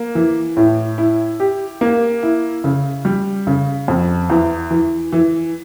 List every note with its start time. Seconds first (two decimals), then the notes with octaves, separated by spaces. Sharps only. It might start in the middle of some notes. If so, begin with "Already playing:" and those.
Already playing: A#3
0.15 E3
0.57 A2
0.98 E4
1.40 G4
1.81 A#3
2.23 E4
2.64 C#3
3.05 G3
3.47 C#3
3.88 F2
4.30 E2
4.70 E3
5.12 E3